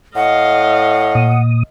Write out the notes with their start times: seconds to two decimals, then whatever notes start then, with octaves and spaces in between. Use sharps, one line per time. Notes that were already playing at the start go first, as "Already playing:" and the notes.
0.16 A2 D#5 F5 F#5
1.15 A#2 D#6